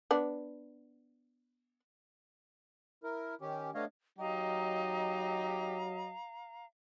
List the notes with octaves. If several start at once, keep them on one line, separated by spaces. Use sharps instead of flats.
B3 D4
E4 A#4
D#3 C#4 G4
A3 B3 D4 C#5 D#5 F5
F#3 D#4 G4 D#5 F5 A#5